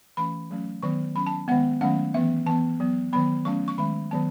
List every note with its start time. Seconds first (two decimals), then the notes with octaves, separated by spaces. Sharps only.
0.17 E3 A3 C#4 B5
0.51 F#3 A3 C#4
0.82 D#3 F#3 B3 C#6
1.16 F#3 C#4 B5
1.27 A5
1.48 D#3 G#3 B3 F#5
1.81 D#3 F#3 A3 C#4 F#5
2.14 E3 B3 E5
2.46 E3 B3 A5
2.80 F#3 B3
3.13 D#3 F#3 B3 B5
3.45 F#3 A3 C#4 C#6
3.68 C#6
3.78 D#3 G#3 C#4 B5
4.11 D#3 F#3 B3 A5